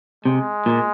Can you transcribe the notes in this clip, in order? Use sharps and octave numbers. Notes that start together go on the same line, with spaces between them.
C3 G#3
A#2